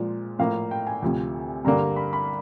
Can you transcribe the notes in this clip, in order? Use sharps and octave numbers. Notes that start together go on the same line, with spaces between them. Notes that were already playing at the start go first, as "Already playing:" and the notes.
Already playing: A#2 F3 G#3
A2 F3 A#3 F5
G5
G#5
D2 C3 F3
G2 D3 G3 A#3 A#5
B5
B5